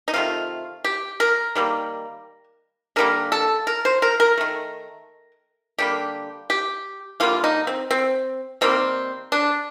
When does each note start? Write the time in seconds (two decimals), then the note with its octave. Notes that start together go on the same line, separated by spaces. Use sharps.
0.08 D#4
0.14 C3 D#3 A3 F4
0.84 G4
1.20 A#4
1.55 D#3 G3 A#3
2.96 D3 G3 A#3 A#4
3.32 A4
3.67 A#4
3.85 C5
4.02 A#4
4.20 A#4
4.38 D#3 A3
5.78 D3 G3 A#3 G4
6.50 G4
7.20 D3 G3 A#3 F4
7.44 D#4
7.67 C4
7.91 C4
8.61 D#3 G3 A#3 C4
9.32 D4